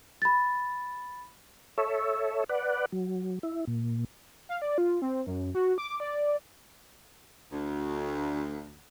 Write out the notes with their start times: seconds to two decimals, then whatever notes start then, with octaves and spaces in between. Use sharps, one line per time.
0.22 B5 A6
1.78 A4 C#5 E5
2.49 B4 D5 F#5
2.92 F#3
3.43 E4
3.67 A#2
4.49 F5
4.62 D5
4.78 F4
5.02 C4
5.26 F#2
5.55 F#4
5.78 D6
6.00 D5
7.52 D2